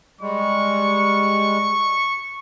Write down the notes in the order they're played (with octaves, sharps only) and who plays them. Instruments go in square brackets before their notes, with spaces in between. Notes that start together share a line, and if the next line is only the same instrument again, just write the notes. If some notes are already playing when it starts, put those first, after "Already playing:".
[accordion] G3 G#3 [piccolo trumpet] C#6